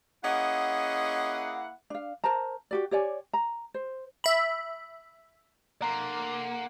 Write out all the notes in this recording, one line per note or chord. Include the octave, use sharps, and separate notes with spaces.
A#3 C#4 E4 G#4 D#5 F#5
D4 F5
A#4 C5 A5 A#5
F#4 G4 D5
G4 C#5 D5 G#5
A#5
C5
E5 B5
A#3 F#5 A#5 C6